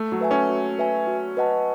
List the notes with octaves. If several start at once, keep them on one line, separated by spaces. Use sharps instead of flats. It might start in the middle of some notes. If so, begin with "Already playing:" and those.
Already playing: A3
F#3
B4 E5 G#5
C#4
F#4
B4 E5 G#5
F#4
B4 D#5 F#5 A5